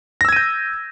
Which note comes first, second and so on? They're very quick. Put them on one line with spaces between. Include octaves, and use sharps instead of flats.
A#6 E6 G#6 D#7 G6